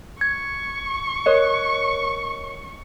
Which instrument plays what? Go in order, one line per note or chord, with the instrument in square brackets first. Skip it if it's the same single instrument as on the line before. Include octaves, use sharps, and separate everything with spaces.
[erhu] C#6 [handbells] G#6
[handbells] A#4 C#5 D#5